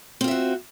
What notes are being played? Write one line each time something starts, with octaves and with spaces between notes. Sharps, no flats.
C4 F4 F#4 E5